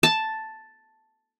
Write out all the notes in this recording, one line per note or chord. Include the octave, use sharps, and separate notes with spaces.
A5